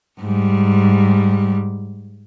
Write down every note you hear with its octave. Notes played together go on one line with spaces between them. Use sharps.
G#2 G3